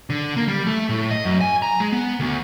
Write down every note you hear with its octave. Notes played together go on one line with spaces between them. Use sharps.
D3
A#3
G3
A3
A2
D#5
F#2
G#5
A#5
G#3
B3
D2